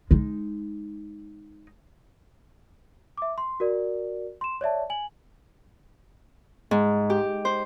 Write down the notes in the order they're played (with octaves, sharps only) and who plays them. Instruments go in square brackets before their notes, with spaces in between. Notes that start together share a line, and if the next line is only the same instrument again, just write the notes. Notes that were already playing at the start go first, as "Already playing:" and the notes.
[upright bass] G#3 D#4
[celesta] E5 D6
C6
F#4 A#4 D5
C6 E7
C#5 D5 E5 A5
G#5 F#7
[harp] G#2
G4
C5